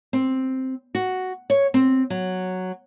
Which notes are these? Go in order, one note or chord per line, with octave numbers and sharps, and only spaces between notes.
C4
F#4
C#5
C4
F#3